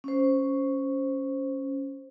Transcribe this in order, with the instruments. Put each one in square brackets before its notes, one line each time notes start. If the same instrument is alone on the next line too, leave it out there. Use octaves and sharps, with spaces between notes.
[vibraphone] C#4 C5